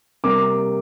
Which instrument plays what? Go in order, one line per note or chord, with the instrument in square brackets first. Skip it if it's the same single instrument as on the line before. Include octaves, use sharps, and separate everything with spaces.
[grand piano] C3 G3 A#3 D6